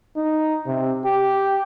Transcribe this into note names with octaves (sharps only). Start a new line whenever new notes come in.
D#4
C3
G4